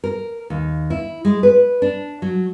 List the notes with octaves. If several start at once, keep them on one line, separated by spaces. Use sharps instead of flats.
A#4
D#2
E4
G#3
B4
D4
F#3